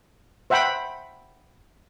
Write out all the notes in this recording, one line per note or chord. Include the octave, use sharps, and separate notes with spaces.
C5 E5 F#5 G5 B5